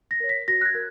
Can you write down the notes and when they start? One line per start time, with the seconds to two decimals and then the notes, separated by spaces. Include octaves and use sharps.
0.11 A#6
0.20 A#4 C#5
0.29 B6
0.48 F#4 A#6
0.61 F#6
0.65 G#6
0.75 A#4